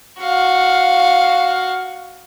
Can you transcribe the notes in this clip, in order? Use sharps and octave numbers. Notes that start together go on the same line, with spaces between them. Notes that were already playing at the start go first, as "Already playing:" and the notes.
F#4 F5